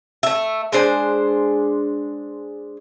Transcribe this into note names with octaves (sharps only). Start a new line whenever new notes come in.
A3 E5
G#3 D4 C5 G#5